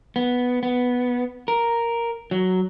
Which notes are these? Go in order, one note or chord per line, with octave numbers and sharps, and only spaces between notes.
B3
B3
A#4
F#3